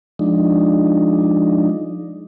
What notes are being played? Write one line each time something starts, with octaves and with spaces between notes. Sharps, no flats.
F3 G#3 D4 D#4